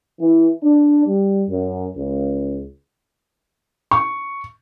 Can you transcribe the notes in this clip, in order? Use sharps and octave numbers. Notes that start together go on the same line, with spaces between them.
E3
D4
G3
F#2
C#2
C#6